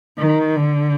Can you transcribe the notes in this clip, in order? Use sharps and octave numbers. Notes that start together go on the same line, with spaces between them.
D#3
D3